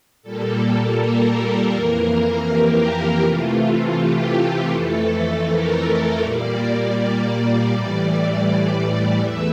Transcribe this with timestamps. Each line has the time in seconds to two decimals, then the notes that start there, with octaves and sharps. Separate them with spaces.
0.23 A#2 G3 A#3 A4
0.98 A#4
1.73 F2 E3 A#3
2.47 G4
3.21 C3 E3 A3 F4
3.97 G4
4.71 F2 E3 A3 A4
5.46 A#4
6.20 A#2 G3 A#3 D5
6.96 D5
7.69 A2 E3 G3
9.19 E2 E3 A3 E5